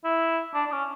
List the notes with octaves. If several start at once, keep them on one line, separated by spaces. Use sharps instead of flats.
E4
D4
D4
C#4